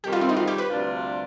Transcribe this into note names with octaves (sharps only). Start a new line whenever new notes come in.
F2 C3 D#3 G3 G4
F4
C4
D#4
F4
G4
B4
D2 C3 G3 D4 F4